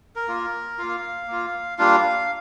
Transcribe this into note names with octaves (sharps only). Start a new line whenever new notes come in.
A#4
A#3 F4
A#3 F4 F5
A#3 F4
G3 A#3 D4 F4 F5